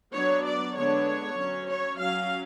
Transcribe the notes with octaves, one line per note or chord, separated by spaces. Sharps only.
F#3 B3 D4 C#5
D5
D3 G#3 B3 D4 C#5
F#3 C#4
C#5
F#3 C#4 F5